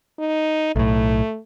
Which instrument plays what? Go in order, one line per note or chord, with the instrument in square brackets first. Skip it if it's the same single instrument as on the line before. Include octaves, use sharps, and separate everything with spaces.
[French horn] D#4
[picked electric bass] B1 A2 [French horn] A3